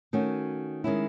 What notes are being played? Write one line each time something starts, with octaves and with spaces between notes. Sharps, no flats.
D#3 A3 C#4 F#4
D#3 G#3 C#4 E4